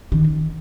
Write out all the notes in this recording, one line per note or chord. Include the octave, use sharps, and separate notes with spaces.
D#3